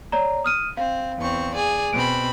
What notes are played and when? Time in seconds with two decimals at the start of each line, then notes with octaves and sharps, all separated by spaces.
0.12 C#5 D5 A#5
0.44 D#6 F6 D#7
0.77 C4 F5
1.20 E2 C4 C#6
1.54 G#4 D5
1.93 B2 C4 B5 D7